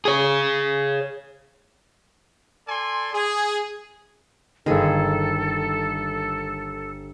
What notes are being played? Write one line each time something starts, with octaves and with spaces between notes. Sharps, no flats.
G#4 C#5
A4 D5 G#5 C6
G#4
G1 D#3 G#4 A4 B5